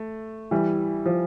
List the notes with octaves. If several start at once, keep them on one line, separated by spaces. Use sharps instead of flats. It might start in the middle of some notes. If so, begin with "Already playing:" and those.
Already playing: A3
E3 G3
F3